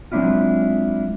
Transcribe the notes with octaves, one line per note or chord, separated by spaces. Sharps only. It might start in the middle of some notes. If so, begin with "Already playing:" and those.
F#3 G#3 C4 D4 E4 F4